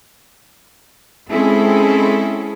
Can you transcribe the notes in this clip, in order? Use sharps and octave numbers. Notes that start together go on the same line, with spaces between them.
G#3 C4 C#4 E4 G#4 A4